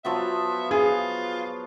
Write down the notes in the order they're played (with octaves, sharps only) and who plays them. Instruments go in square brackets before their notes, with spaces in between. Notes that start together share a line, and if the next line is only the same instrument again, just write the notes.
[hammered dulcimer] F3 F#3 B3 [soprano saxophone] E5
[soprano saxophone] F4 [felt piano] G#4